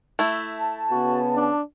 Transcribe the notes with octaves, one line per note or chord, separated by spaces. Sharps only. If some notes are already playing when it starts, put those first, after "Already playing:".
A3 E4
A5
C#3 B3 F#4
D4